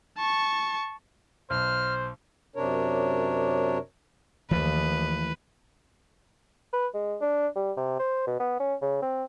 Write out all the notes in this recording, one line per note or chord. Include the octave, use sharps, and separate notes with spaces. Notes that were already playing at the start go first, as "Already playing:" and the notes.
A5 C#6
B1 C5 F6
F#2 C3 D4 A#4 C#5
D#2 E3 F3 A3 B4
B4
G#3
D4
G3
C3
C5
B2
B3
C#4
C#3
C4